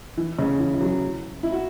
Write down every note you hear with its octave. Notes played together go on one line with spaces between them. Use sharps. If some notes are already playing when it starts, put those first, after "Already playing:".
E3
C#3
E3
E3
F#3
E4
F#4